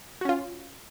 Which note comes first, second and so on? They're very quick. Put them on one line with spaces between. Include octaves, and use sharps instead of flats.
F#4 C#4 F4